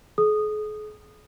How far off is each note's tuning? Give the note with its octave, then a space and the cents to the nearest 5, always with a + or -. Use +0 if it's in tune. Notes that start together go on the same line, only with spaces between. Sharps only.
G#4 +45 D#6 -15